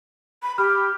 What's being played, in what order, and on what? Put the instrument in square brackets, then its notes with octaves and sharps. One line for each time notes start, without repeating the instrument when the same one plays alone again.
[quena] B5
[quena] G4 [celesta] B5 F6